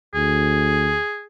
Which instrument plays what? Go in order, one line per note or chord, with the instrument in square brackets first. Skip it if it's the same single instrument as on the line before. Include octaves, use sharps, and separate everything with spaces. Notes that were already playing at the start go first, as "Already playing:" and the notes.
[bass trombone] D2 [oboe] G#4